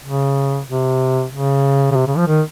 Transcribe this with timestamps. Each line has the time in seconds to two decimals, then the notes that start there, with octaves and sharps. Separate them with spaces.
0.04 C#3
0.68 C3
1.33 C#3
1.91 C#3
1.96 C3
2.07 C#3
2.17 F3
2.27 D#3